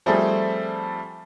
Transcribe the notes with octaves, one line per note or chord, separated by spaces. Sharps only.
F3 G3 A3 C4 G#4 A4